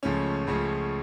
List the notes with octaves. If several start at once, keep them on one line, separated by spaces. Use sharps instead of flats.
C#2 C#3 F3 A3 C#4
C#2 C#3 F3 A3 C#4